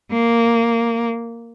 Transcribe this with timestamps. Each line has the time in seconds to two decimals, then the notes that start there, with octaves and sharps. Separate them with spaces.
0.11 A#3